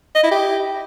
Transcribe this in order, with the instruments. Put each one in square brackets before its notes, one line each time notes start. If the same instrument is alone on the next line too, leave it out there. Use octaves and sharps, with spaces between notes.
[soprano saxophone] D#5
E4
G4